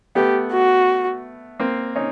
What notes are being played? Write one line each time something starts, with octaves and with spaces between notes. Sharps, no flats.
A3 B3 G4
F#4
A#3 C4
C#4 D#4